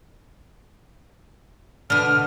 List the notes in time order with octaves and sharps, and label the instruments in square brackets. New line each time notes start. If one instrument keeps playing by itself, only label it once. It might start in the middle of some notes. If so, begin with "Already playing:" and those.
[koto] B2 D3 [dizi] F6